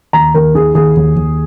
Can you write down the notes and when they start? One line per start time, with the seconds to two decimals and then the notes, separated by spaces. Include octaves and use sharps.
0.13 D#2 A#5
0.34 D#2 A#4
0.54 D#3 G#4
0.75 D#2 G#4
0.96 D#2
1.16 D#2